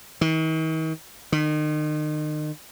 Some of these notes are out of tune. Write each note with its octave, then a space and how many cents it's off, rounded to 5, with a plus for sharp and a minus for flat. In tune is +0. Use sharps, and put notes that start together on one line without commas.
D#3 +45
D#3 -35